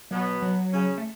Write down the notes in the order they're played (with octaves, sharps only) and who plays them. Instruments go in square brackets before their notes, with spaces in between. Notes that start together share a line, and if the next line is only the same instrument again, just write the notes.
[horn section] B2 B3 [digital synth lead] F#3
[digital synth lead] F#3
[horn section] C#3 C#4
[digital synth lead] A3